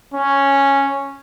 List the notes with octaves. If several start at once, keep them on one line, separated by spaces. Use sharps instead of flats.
C#4